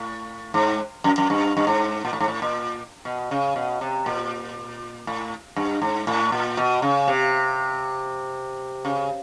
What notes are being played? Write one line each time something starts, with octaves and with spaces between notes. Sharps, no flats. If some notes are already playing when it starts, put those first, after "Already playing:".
Already playing: A2
G#2
F#2
F#2
G2
G2
G#2
A#2
A2
G#2
A2
A#2
B2
C#3
B2
C3
A#2
A2
G2
G#2
A2
A#2
B2
C#3
C3
C#3